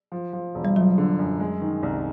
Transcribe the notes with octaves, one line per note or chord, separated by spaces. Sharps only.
F3
F3
E1
G3
F3 F#3
D3
F#2
G#3
D#3
C2